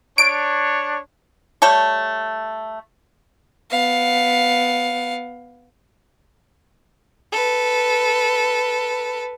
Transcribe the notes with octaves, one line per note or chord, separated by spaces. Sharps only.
D4 C#5 D7
G3 A3 A4 C#5
B3 F5
A4 B4